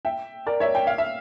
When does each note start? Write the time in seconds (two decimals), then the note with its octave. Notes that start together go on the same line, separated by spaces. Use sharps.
0.05 E5 G5
0.47 A#4 D5
0.60 C#5 E5
0.75 G5
0.87 F5
0.98 E5